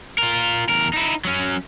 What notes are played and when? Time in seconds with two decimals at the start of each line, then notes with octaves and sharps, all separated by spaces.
0.18 F4 A#4
0.69 E2 A#4
0.93 D#4 E4
1.25 F#3 C#4